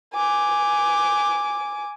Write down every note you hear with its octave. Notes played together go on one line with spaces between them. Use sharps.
G#5 D6